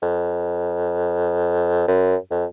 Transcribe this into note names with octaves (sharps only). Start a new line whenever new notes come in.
F2
F#2
F2